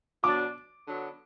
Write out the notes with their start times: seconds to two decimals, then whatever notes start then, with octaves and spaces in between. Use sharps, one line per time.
0.23 B2 F#3 D4 D6
0.86 D3 F#3 B3